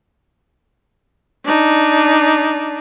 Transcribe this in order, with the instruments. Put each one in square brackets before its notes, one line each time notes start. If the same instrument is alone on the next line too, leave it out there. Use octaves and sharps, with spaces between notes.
[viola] D4 D#4